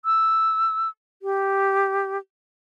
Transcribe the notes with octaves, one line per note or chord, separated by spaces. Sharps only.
E6
G4